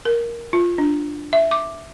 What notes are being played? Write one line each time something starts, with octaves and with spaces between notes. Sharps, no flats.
A#4
F4
D4
E5
D6